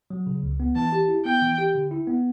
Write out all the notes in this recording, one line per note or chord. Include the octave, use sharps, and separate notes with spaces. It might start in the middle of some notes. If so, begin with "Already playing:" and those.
F#3
C#3
C#2
B3
E3 A5
G4
E4
B3 G5
E3
G4
D3
E4
B3